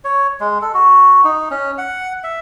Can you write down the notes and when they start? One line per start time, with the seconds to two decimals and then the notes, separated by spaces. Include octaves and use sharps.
0.04 C#5
0.40 G#3
0.62 A4
0.74 F#4
1.24 D#4
1.51 C#4
1.78 F#5
2.24 E5